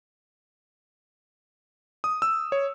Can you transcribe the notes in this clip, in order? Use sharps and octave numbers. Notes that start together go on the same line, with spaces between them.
D#6
E6
C#5